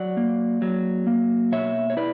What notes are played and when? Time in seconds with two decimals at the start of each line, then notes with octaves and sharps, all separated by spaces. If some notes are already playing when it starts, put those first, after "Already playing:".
Already playing: F#3 D5 F#5
0.17 A#3
0.62 F#3
1.07 A#3
1.52 B2 C#5 E5
1.90 C#5
1.97 E4 B4 D5